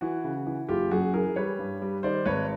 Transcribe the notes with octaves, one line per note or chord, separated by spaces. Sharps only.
E3 F#4
C#3
E3
F#1 F4 G4
F#2 F#4 G#4
E3 G#4 A#4
G3 B4 C#5
G2
G3
D#3 C5 D5
G#1 B4 C#5